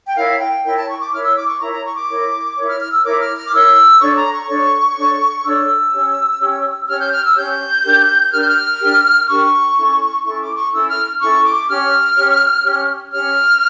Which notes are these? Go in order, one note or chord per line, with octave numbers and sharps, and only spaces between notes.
G5
E4 A#4 C#5 F5
G5
E4 A#4 C#5 G5
A5
C#6
D6
E4 A#4 C#5 F6
E6
D6
C#6
E4 A#4 C#5 A#5
A#5
C#6
D6
E4 A#4 C#5
E4 A#4 C#5
F6
F6
E6
E4 A#4 C#5 D6
F6
F6
D6
E4 A#4 C#5 E6
D4 A4 C#5 C#6
A#5
C#6
D4 A4 C#5
D4 A4 C#5
D4 A4 C#5 E6
C#4 G4 C#5
C#4 G4 C#5
C#4 G4 C#5 F6
G6
F6
E6
C#4 G4 C#5 G6
D4 G4 A#4
D4 G4 A#4 F6
G6
F6
D4 G4 A#4
D4 G4 A#4 C#6
C#4 E4 A4
C#4 E4 A4 C#6
D6
C#6
C#4 E4 A4 E6
F6
C#4 E4 A4 C#6
D6
C#4 G4 C#5 F6
C#4 G4 C#5
C#4 G4 C#5
C#4 G4 C#5 F6